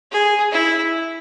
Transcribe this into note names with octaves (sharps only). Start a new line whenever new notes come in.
G#4
E4